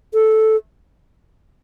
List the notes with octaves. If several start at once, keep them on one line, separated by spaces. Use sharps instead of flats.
A4